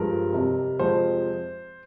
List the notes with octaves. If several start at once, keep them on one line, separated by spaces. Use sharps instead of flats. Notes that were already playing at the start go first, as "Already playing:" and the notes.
Already playing: G2 F3 G#3 A#4
F2 C3 G3
F2 C3 F3 G#3 C5